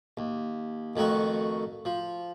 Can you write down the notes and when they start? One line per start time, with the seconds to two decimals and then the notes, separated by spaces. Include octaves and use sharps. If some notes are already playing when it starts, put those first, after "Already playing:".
0.17 D#2
0.96 F2 D#3 A3 F#4 C#6
1.85 F3